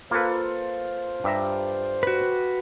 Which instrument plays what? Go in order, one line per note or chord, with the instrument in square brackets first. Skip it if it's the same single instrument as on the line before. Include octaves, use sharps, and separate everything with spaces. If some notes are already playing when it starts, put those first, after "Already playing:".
[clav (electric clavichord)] A#3 B4 [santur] F4 A4 [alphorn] C5
[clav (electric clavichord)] G2 E5 A#5 [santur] G4
[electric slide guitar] F#4 B4